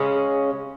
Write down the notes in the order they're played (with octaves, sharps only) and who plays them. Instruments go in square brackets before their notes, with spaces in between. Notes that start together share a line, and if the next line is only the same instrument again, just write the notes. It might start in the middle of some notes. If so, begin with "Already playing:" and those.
Already playing: [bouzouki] C#3 G#3 C#4